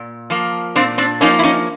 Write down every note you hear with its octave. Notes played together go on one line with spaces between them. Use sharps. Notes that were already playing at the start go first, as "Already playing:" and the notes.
Already playing: A#2
F3 A#3
A#2 C4 D4
C4 D4
F3 A#3 C#4 D#4
E4
C#4 D#4